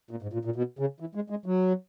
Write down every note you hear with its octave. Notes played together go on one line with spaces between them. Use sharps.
A#2
G#2
A#2
A#2
B2
C#3
E3
G#3
G#3
F#3